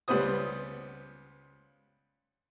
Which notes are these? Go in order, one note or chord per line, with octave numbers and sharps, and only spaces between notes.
C#2 G3 B3 C5 D#6